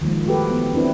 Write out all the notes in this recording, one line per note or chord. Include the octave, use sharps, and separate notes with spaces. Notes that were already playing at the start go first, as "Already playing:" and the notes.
D#3 F3 G#3 A#3
A3 F#4 G4 A4 B4
E3 B3
C4 D4 E4 B4